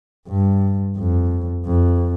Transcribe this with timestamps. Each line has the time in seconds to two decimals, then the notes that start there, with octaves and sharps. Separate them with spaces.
0.28 G2
0.98 F2
1.66 F2